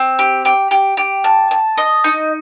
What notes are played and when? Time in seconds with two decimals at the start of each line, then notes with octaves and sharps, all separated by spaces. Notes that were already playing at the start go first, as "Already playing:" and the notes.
Already playing: C4
0.19 G4
0.45 G4
0.71 G4
0.97 G4
1.24 A5
1.51 A5
1.77 D#5
2.04 D#4